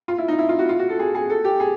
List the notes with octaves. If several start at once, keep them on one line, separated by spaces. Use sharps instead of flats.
F4
E4
D#4
E4
F4
F#4
F4
F#4
A4
G#4
G#4
A4
G4
G#4